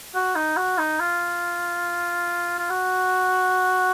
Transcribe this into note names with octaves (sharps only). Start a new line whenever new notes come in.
F#4
D#4
F#4
D#4
F4
F4
F#4